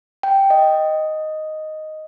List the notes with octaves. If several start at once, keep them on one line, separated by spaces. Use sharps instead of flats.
G5
D#5